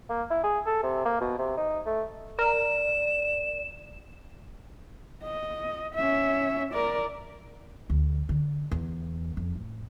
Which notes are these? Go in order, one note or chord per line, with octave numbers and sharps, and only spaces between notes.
A#3
E4
G#4
A4
C3
A#3
B2
C3
D#4
A3
A#4 D5 E7
D#5
C#4 E5
A#4 D5
D2
D3
E2
F2
A2